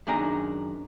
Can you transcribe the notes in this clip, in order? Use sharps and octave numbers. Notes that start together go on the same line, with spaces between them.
F#2 D#3 D4 G#4 G5 A#5